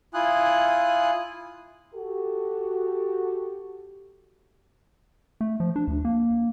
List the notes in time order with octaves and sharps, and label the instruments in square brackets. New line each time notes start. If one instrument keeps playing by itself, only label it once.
[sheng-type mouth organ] E4 F4 G#5 D#6 F#6
[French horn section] F#4 G4 A4
[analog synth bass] A3
F3
D4
D2
A#3